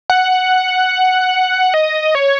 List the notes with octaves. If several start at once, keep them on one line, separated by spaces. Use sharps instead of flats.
F#5
D#5
C#5